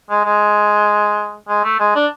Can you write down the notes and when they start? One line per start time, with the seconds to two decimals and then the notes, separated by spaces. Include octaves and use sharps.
0.10 G#3
0.25 G#3
1.48 G#3
1.64 A3
1.79 G#3
1.95 D4